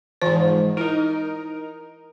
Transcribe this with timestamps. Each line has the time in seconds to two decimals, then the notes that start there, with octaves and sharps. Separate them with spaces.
0.22 G#2 E3 F3 C5
0.77 D#4 E4 A#4